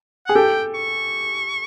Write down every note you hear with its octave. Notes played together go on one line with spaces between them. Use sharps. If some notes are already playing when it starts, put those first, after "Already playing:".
G#4 F#5
G4 A4 G5
C#6